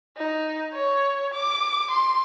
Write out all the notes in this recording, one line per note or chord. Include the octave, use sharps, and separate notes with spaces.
D#4
C#5
D6
C6